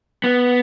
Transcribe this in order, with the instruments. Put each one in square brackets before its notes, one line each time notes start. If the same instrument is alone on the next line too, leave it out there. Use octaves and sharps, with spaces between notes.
[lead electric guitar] B3